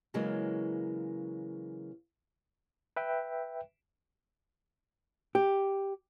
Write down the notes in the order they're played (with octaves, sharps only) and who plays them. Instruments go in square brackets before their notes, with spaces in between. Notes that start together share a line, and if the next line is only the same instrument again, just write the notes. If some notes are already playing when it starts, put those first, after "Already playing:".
[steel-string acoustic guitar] C#3 E3 F#3 G#3 A#3
[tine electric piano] B4 E5 G5
[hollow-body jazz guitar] G4